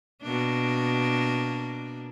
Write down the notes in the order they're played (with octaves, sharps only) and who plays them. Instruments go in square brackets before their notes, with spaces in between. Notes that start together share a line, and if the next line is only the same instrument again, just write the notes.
[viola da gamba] B2 A#3 D4